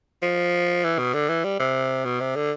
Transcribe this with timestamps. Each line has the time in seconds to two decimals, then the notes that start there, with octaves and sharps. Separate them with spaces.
0.22 F3
0.84 E3
0.99 B2
1.14 D3
1.29 E3
1.44 G3
1.60 C3
2.05 B2
2.20 C3
2.36 D3